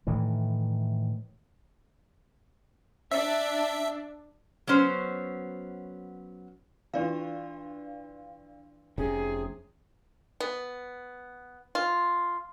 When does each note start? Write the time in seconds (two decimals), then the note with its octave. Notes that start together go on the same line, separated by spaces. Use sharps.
0.07 A2 D#3 E3
3.12 D4 E5
4.67 F#3 B3 C#4 C5
6.94 E3 D4 F4 D5 F5
8.98 F1 C3 C#4 G#4
10.40 B3
11.75 F4